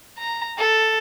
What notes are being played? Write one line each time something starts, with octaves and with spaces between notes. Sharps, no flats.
A#5
A4